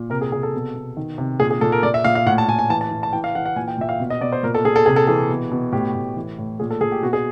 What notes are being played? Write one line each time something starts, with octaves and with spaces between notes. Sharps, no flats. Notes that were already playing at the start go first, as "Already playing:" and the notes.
Already playing: A#2
C3 A#4
G#4
C3 G#4
A4
B2
B2
D#3
C3
A#2 G#4
G#4
A#2 A4
A#4
A#2 D5
E5
A#2 F5
F5
A2 F#5
A5
A2 G#5
G#5
E3 A5
A5
E3
A5
E3 G5
F5
E3 F#5
F#5
A#2 G#5
G5
A#2 E5
F5
B2
D#5
B2 D5
C5
A#2 A#4
A4
A#2 G#4
A4
C3 G#4
A4
E3 G#4
B2
B2
A2 G4
A2
E3
A2
A#2 G#4
A4
A#2 G#4
G4
B2 F#4
G#4